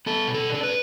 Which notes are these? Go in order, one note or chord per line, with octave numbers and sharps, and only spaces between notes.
B3 A4
B2
A4
D4 A4
B4